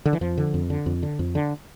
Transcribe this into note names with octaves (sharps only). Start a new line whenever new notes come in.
D3
E3
F2 F3
D3
F2
D3
F2
D3
F2
D3